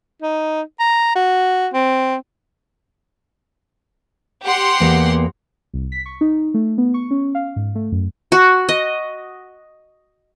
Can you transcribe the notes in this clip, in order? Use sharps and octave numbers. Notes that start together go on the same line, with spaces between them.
D#4
A#5
F#4
C4
G4 F#5 C6
E2 A#3
C2
B6
C#6
D#4
A3
B3
C#6
C#4
F5
G#2
A3
F#2
F#4
D#5